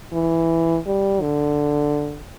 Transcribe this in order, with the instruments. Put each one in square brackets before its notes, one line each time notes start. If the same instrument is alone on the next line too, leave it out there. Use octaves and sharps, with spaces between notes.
[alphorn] E3
G3
D3